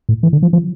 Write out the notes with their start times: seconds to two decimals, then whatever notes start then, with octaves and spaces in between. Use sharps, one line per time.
0.09 A2
0.23 E3
0.33 D3
0.43 F3
0.53 F3